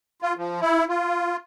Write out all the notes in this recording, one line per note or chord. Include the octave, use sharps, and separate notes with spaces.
F4
F3
E4
F4